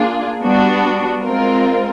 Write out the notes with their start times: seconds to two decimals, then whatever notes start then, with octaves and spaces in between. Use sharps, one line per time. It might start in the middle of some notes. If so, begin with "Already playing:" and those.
Already playing: A#3 D4 F4 G#4
0.42 G3 B3 D4 F#4
1.23 G#3 C4 F4 A#4